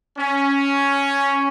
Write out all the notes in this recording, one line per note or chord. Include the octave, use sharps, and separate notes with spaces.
C#4